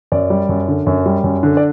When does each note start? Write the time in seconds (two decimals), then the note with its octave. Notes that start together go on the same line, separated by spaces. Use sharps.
0.12 F#2 D5
0.30 G3
0.49 F#2
0.68 D3
0.86 F#2
1.06 G3
1.24 F#2
1.43 D3
1.57 D5